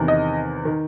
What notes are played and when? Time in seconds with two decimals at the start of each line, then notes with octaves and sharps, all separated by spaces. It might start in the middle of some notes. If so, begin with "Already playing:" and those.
Already playing: E2 C3 D#3
0.08 D#5
0.65 D#3